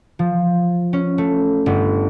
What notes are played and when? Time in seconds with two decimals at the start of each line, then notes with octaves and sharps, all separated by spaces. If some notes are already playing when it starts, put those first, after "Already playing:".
0.19 F3
0.93 C#4
1.18 A3
1.66 G1